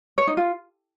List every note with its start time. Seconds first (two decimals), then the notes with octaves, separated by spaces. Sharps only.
0.18 C#5
0.27 D#4
0.37 F4